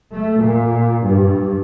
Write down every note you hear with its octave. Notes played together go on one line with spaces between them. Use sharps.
A3
A#2
G2